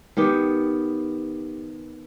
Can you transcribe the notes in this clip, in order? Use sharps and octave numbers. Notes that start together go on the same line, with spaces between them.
D#3 B3 G4